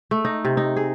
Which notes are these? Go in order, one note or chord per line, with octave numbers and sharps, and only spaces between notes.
A3
D#4
C3
D#4
G#4